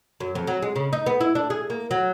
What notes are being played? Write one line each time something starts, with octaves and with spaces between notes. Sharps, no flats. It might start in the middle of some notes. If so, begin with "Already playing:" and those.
F#2
F2
F#3
G#3
C#3
D#4
B3
E4
D4
G#4
A#3
F#3